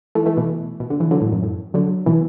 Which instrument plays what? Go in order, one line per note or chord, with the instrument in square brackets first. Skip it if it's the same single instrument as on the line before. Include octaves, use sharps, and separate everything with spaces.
[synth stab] E3 A3
E3 A3
B2 E3
B2
D3
E3
D3 F#3
A2
F#2
A2
D3 F#3
B2 E3